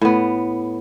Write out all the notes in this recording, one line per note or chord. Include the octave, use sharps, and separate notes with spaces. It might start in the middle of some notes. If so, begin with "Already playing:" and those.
A2 B3